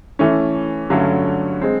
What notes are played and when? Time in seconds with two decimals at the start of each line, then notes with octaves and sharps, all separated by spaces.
0.19 E3 A3 C#4
0.90 G2 D3 F#3 A3 C#4
1.62 G#3 C4